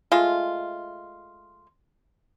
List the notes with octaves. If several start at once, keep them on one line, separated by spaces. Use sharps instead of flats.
G#3 A3 F4